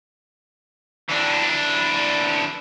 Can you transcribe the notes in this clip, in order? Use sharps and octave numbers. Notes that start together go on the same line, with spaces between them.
E3 D4